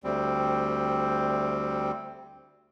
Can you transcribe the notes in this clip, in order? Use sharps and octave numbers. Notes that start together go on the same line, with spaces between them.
D2 G3 C4